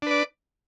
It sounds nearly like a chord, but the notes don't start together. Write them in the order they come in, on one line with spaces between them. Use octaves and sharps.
D4 B4 D5